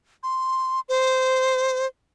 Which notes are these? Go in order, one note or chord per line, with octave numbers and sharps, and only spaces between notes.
C6
C5